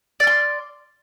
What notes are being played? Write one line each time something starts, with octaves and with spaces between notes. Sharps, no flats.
D5 C6 F6